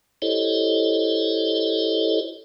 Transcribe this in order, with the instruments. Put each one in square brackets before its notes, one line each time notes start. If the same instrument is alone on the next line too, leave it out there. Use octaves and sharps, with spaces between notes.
[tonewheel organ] E4 G4 A4 C5 C#5 D#5